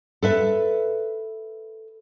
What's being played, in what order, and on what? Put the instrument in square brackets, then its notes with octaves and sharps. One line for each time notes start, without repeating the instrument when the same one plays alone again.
[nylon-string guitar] A4 B4 E5